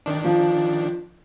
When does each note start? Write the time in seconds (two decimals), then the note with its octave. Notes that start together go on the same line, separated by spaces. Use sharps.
0.06 D#3 D4
0.24 F3